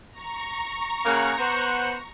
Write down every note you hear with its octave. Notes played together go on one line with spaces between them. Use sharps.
A#5 C#6
C#3 A#3 F#5
B3 C5 F#5